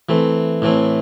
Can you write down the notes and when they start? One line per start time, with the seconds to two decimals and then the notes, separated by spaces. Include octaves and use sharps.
0.09 E3 A3 C4
0.62 A2 E3 A3 C4